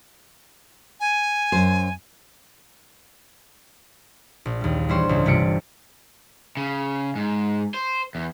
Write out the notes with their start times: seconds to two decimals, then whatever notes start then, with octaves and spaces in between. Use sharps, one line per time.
1.00 G#5
1.52 F#2 C5
4.45 A#1
4.61 D#2 G3
4.89 E3 G3 D4 C5 C#5
5.09 C#2 G#2
5.26 G1 C3 G3 F4 C#7 D7
6.57 C#3
7.15 G#2
7.74 C5
8.15 E2